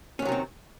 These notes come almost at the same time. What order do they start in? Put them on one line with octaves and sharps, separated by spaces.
C#4 C3 F#3 D#3 C4